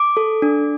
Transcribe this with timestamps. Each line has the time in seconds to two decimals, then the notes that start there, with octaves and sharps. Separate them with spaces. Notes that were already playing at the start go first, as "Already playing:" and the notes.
Already playing: D6
0.17 A4
0.42 D4